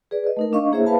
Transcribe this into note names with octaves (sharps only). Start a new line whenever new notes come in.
G#4 B4 D5
B4 D#5
A3 D#4 A#4
D4 D#5 F5 C#6
A#3 E4 G#4 C5 C#5 E5
B4 F5 A5 B5